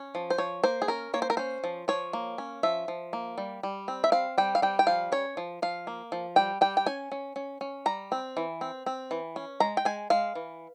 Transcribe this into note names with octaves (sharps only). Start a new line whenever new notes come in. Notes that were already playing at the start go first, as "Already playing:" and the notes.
Already playing: C#4
F3
C5
F3 C#5
A#3 C5
G#4
C#4 A#4
A#3 C#5
C5
A#4
C#4 C5
F3
F3 C#5
A#3
C#4
F3 E5
F3
A#3
G3
G3
C4
E5
C4 F5
G3 G5
F5
G3 G5
G5
F3 F5
C#4 C#5
F3
F3 F5
A#3
F3
G3 G5
G3 G5
G5
C#4 G#5
C#4
C#4
C#4
G3 A#5
C4
E3
C4
C4
E3
C#4
G#3 A#5
G5
G#3 G#5
G#3 F5
E3